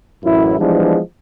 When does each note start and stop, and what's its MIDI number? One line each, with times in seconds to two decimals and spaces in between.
0.23 0.58 33
0.23 0.58 42
0.23 0.58 64
0.59 0.99 52
0.59 0.99 53
0.59 0.99 55
0.59 0.99 56
0.59 0.99 59
0.59 0.99 62